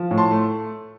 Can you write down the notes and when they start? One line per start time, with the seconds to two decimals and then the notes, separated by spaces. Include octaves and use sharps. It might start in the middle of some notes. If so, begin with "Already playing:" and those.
Already playing: F3
0.11 A2
0.18 A5 C6
0.31 A3